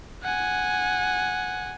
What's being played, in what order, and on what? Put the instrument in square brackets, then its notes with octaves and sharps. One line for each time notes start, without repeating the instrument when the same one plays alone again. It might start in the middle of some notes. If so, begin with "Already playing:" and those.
[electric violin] F#5 G#5